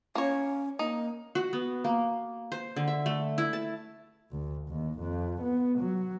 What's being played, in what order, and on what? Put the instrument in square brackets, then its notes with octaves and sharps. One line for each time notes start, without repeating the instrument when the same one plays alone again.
[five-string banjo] A#3 C#5 [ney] C#4
[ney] A#3 [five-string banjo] D#4
[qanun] F#4
B3
A#3
C5
D3
E5
A3
E4
A5
[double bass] D2
D#2
F2
B3
F#3